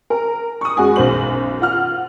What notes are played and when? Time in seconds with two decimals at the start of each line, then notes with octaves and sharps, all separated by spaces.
0.10 A#4
0.61 C#6 D#6
0.77 F#2 G#3 F#4 G#5
0.96 B1 F#2 C5 F#7
1.61 F4 F#5 F6